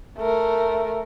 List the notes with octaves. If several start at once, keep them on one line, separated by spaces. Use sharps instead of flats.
A3 A#4